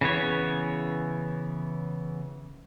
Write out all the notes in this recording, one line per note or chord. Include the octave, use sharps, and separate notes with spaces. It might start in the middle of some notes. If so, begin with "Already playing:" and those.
C#3 E3 B3 C#5